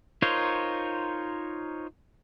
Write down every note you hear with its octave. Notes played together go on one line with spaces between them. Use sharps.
D#4 F4 A#4 C5 C#5